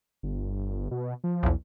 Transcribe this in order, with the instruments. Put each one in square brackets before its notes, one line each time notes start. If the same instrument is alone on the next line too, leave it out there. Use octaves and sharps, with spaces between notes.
[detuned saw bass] G1
B2
F3
[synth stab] B1 E2